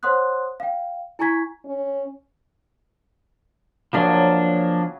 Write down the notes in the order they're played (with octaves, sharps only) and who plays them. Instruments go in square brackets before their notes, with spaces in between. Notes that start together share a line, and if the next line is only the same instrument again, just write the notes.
[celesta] C5 C#5 F#5 C6 D#6 F#6
F5 G5
E4 G#5 A#5 C#6 G#6 B6
[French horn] C#4
[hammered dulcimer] C#3 F#3 G#4 [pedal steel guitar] F3 A#3 D4